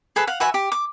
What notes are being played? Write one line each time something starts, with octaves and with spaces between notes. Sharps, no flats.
G#4 A4 B4
F5 F#5
F#4 B4 E5 G#5
G4
D6